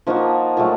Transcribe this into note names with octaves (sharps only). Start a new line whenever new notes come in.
F3 A#3 D#4 F#4
A#2 F#3 A3